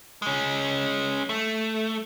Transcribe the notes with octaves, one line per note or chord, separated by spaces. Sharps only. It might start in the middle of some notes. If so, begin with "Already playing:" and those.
G#3 C#4
A3